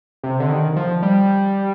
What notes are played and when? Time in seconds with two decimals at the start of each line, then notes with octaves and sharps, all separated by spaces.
0.24 C3
0.40 D3
0.50 D#3
0.76 F3
1.03 G3